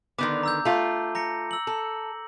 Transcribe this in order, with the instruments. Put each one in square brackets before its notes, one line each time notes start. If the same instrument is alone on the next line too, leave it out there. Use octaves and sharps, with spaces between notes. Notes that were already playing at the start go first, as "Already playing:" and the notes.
[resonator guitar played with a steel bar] D3 D#3 B3 [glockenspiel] D6
[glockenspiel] A#5 E6 G6
[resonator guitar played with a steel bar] A3 F4
[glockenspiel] A#5 A#6 C#7
E6 F#7
[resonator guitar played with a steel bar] A4